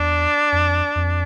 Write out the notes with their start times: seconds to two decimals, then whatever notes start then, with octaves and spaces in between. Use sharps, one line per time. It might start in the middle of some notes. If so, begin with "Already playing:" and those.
Already playing: E2 D4
0.52 F2
0.95 F2